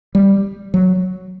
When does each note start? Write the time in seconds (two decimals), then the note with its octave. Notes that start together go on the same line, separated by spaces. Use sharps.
0.15 G3
0.74 F#3